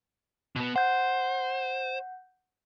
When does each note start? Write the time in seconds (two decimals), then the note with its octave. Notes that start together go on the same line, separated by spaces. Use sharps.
0.56 B2 B3
0.76 C5 F#5 G6